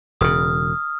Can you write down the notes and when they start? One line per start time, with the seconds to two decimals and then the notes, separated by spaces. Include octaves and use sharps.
0.21 E1 C#3 D#6 F6